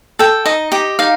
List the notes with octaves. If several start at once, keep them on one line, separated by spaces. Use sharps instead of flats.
A4 G5
D#4 D#5
G4 D#5
D#4 F5